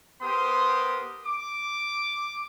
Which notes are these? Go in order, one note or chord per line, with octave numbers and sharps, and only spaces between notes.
B3 G4 A#4 C5 C6 D#6
D6